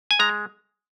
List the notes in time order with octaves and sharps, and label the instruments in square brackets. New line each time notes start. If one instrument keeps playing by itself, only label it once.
[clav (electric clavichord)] G#5
G#3 A#5